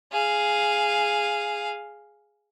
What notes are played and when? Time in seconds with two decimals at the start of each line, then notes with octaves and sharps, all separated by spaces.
0.12 G#4 F5